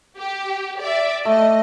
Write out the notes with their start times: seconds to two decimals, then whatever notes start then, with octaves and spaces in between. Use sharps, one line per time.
0.18 G4
0.80 D5 E5
1.25 A3 D#5